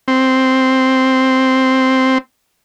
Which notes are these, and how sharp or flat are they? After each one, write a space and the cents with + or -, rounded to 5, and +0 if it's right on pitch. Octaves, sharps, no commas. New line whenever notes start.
C4 +0